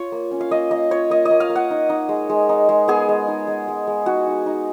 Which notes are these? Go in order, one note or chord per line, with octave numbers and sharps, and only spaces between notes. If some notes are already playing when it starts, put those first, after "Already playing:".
Already playing: F4 C#5
A#3
C#4
F5
A#3 D#5
A#3 D#5
F4 C#5
A#3 D#5
D#5
A#3
F5
A#3
F#5
D#4
D#4
G#3
G#3
D#4
G#3
B3 G#4
G#3
D#4
G#3
G#3
G#3
D#4 F#4
D#4
D#4